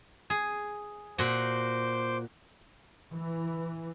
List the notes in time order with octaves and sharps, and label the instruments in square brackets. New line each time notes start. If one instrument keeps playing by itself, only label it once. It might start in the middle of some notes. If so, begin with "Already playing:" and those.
[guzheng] G#4
[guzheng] A#2 F#4 [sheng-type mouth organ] C5 D6 G6
[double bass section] E3